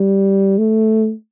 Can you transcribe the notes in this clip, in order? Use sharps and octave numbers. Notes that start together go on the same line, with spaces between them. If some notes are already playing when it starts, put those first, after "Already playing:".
Already playing: G3
A3